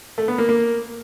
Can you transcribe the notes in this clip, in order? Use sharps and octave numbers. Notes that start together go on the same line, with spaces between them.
A3
B3
A#3
A#3